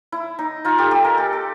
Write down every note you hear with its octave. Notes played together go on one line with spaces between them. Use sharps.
E4
D#4
D#4 F4
G4 A4
G4 A4
G#4 A#4
G4 A4
A4